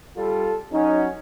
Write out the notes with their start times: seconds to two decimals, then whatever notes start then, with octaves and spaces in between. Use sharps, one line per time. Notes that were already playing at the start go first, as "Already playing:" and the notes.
0.16 G3 F4 A4
0.73 F#3 C#4 D#4